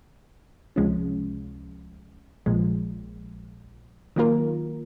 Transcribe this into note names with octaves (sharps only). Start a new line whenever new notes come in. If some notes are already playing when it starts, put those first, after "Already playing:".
C#2 C3 F3 G#3 C#4
A#1 A#2 F3 G#3
D#3 F#3 A#3 F4 A#4